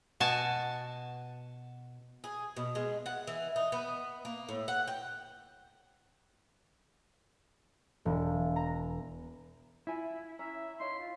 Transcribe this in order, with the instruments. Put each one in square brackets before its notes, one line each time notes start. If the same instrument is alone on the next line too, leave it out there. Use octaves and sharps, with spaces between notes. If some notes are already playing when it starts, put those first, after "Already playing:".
[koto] B2 F#4 G#5 A5
[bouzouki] G#4
B2
G#3
F#5
E3
D#4
B3
A#3
A2
F#5
G5
[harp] E1
A#5
[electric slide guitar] E4 [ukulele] F4 E5 G#5
[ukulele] C#4 A#5 [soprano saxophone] E5
[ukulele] D#4 C#5 F5 [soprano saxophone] C6
[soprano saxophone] F4